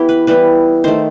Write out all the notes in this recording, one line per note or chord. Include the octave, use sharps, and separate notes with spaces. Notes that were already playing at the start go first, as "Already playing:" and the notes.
Already playing: E3 B3 E4 G4
B4
E3 G3 B3 B4
D#3 A3 C5